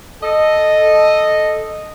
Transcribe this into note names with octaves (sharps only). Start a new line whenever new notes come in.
A4 D#5